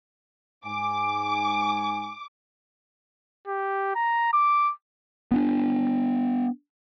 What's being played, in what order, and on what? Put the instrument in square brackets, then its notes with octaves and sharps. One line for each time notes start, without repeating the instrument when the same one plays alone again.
[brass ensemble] G#2 G#5 [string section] D6
[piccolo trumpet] G4
A#5
D6
[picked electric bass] B3 C#4 D4